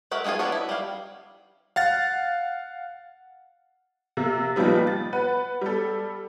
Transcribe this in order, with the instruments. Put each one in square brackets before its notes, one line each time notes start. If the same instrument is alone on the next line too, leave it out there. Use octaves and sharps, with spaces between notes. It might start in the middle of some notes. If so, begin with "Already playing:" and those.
[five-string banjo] G#3 F#4 A#4 E5
G#3 A#3 E4 F4 G#4
F3 B3 C#4 D4 F#4
E4
G3 F5
[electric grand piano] F5 F#5 A6
[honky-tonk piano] C3 A#3
A#2 D#3 F3 G3 B3
A6
B4 F#5
G3 A4